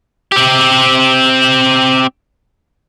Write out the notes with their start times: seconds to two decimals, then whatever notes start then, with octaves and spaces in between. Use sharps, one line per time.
0.32 C4 G4